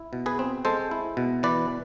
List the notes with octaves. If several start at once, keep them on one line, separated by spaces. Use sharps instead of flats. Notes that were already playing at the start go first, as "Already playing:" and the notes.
Already playing: E4
B2
G#4 B4
C4
G#3 A4 C5
E4
B2
E3 B4 D5